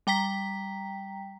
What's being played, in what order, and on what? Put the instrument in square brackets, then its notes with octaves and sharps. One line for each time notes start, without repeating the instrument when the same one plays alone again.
[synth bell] G3 G5 A#5 B6